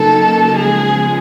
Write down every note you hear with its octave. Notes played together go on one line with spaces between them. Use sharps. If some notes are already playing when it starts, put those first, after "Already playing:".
Already playing: C#3 F#3 A#3 D#4 A4
C#3 F3 G#3 B3 G#4